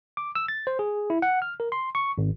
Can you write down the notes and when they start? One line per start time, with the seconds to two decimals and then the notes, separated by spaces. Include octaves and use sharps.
0.17 D6
0.35 E6
0.48 A6
0.67 C5
0.79 G#4
1.10 E4
1.22 F#5
1.42 F6
1.60 A#4
1.72 C6
1.95 C#6
2.18 G#1